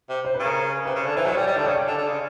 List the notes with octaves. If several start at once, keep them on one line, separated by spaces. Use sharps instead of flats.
C3
C5
B4
C#3
A#4
C3 B4
C#3
D3
E3 C5
F#3
G3 C#5
G3 D#5
D3 D5
C#3 C#5
D5
D3
D3
C#3